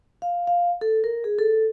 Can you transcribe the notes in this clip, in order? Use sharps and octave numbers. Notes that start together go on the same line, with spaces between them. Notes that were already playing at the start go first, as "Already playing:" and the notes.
F5
F5
A4
A#4
G#4
A4